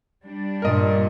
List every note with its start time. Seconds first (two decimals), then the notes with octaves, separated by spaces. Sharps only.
0.23 G3 D4
0.62 G2 A#2 A#4 D#5